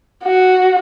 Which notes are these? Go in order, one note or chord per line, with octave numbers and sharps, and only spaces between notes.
F#4